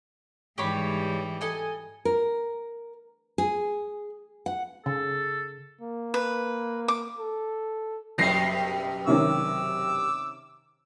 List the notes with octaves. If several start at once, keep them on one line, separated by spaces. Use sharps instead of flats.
G#2 E3 G3 G4 C#5 B5
A4 D#5 G#5
A#4
G#4
F#5
C#3 A4
A#3
B4
D6
A4
F#1 G2 B2 G3 A#6 C7
C3 D#3 C#4 D6 E6